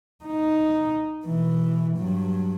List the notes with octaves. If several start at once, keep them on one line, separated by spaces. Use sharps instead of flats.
D#4
B2 E3
G2 F#3